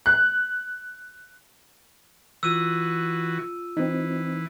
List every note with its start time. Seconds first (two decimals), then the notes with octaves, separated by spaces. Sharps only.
0.06 F#6
2.43 E3 F4 F#4 E6 D#7
3.77 E3 C4 D#4